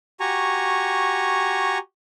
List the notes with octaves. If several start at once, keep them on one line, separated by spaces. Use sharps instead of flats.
F#4 G4 G#5 A#5 C#6